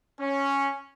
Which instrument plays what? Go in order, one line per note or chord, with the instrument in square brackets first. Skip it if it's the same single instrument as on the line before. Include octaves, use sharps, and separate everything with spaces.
[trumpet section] C#4